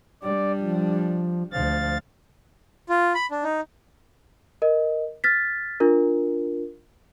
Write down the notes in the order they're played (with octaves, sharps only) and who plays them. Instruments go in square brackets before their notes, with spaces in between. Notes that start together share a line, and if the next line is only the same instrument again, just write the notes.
[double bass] G3 D4 [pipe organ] D5
[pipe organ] F3
[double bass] D2 F3 [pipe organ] F5 A6
[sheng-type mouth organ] F4
B5
D4
D#4
[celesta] A#4 D#5
F6 A6 B6
D4 F4 A#4